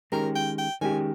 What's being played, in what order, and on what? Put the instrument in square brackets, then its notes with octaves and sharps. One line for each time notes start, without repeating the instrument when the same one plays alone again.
[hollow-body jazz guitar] D#3 G#3 C#4 G4 [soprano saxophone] A#4
[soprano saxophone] G5
G5
[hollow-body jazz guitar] D#3 G#3 C#4 G4 [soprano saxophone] G#5